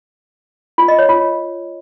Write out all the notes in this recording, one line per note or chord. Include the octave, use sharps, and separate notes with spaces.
F4
D#5
C#5
F4